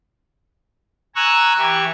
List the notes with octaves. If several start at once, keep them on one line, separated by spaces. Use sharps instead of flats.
G#5 A#5 C#6 E6 F#6
E3 G4 C#6